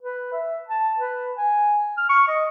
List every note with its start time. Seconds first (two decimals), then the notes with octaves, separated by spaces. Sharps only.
0.02 B4
0.33 E5
0.68 A5
0.98 B4
1.38 G#5
1.97 F6
2.09 C#6
2.28 D#5